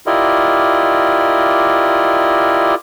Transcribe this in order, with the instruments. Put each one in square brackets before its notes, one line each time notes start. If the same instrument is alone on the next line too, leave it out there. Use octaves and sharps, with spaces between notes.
[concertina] E4 F4 G4 A#4 D5 D#5